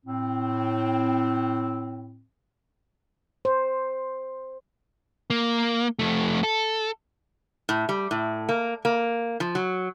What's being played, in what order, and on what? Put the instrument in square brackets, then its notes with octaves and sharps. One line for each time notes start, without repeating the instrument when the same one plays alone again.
[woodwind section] A2 C4
[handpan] C5
[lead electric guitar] A#3
F2 A3
A4
[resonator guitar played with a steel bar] A2
G3
A2
A#3
A#3
F3
F#3